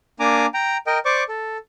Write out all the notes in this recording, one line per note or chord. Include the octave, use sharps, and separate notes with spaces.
A#3 D4 G#5 A#5 D6
G5 A#5
A#4 D#5 G5
C5 D5 C#6 D6
A4